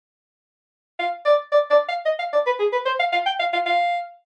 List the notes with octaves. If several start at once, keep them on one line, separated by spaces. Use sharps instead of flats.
F5
D5
D5
D5
F5
D#5
F5
D5
B4
G#4
B4
C5
F5
F5
G5
F5
F5
F5